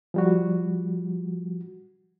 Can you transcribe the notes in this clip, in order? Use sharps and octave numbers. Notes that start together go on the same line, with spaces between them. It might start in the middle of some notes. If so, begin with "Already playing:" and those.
F3 G3 F#4